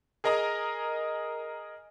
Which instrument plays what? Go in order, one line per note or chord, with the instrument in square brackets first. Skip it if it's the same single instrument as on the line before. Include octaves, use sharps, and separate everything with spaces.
[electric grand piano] G#4 A#4 D#5 G#5 A#5